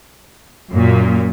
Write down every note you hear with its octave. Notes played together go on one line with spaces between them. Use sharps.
F#2 A#2